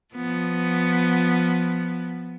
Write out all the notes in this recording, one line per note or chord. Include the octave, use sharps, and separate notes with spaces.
F3 B3